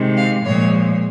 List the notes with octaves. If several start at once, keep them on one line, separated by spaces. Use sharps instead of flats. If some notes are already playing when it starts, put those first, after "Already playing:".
Already playing: C3 D#3 G#3
F5
A#2 F3 G#3 C#5